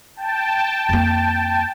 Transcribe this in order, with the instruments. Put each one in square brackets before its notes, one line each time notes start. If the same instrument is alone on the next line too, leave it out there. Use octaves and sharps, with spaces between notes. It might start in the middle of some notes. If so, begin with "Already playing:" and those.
[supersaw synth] G5 A5
[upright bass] F2 A#3